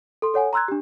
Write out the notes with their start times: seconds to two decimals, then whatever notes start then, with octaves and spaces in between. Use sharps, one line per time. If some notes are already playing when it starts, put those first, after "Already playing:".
0.22 A4 C6
0.34 A4 C#5 F#5 G#5
0.53 A#5 C6 E6 F#6 G#6
0.68 D4 G4